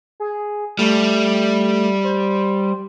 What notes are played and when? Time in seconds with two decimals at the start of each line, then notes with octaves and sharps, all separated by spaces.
0.20 G#4
0.79 G3 A3
2.04 C5